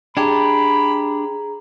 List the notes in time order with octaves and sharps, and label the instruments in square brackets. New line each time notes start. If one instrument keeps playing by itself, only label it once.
[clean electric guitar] D4 G4 [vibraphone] G#4 A#5 [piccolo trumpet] B5